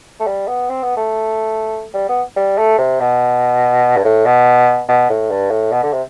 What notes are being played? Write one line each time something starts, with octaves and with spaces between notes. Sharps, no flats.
A3
G3
B3
C4
B3
A3
G3
B3
G3
A3
C3
B2
G2
A2
B2
B2
A2
G2
A2
B2
D3
C3